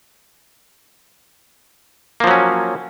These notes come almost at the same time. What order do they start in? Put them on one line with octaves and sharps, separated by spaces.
A#3 F3 F#3 C#4